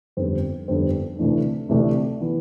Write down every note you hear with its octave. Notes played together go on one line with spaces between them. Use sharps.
G1 F2 D3 G3 C4
G1 F2 D3 G3 C4
D2 C3 E3 A3 D4
D2 C3 E3 A3 D4
E3 B3